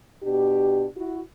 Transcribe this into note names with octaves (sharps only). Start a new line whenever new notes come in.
B2 D4 G4
E4 F#4